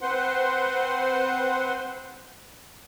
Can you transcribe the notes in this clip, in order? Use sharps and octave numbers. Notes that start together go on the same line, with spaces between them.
C4 B4 C5 F#5 C6